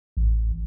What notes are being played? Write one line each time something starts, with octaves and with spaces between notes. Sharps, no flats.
A1